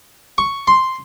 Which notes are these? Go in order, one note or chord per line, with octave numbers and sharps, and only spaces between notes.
C#6
C6